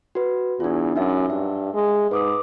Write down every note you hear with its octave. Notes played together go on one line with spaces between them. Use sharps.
F#4 B4
E2 D4 F4
F#2 D#4 E5
G2 E5
G#3
G#2 B4 D6 D#6